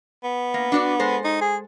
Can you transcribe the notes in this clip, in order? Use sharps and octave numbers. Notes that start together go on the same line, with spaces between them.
B3
A#3
D4 F#4 D5
G#3 A4 C5
D#4
G#4